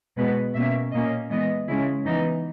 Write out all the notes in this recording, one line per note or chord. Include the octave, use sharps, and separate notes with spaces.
B2 G#3 B3 B4
B2 A#3 C#4 E5
A#2 A#3 C#4 D#5
E3 G#3 B3 D#5
C#3 G#3 C#4 E4
E3 B3 D#4